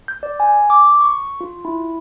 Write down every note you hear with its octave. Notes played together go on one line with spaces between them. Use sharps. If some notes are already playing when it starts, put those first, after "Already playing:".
G6
D5
G#5
D6
C#6
F4
E4